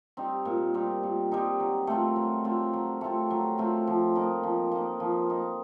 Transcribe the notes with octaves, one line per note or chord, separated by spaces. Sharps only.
G3 C4 D#4
A#2
G3 C4 D#4
A#2
G3 C4 D#4
F#3
A3 C4 F4
F#3
A3 C4 F4
F#3
A3 C4 F4
F#3
A3 C4 F4
F3
A#3 D#4
F3
A#3 D#4
F3
A#3 D#4